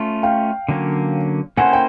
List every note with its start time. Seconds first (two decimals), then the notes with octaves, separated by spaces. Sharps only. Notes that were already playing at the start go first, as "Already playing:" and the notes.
Already playing: A3 C#4 F4
0.23 F5 G5
0.69 D3 F#3 A#3 C#4
1.57 A#3 C#4 E4 A4 C5 F#5 G#5
1.73 G5